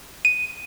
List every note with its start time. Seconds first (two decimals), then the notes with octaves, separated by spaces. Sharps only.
0.25 D#7